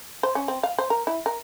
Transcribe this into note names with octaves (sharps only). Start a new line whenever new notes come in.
C5
C#4
C4
F5
C5
A#4
E4
A#4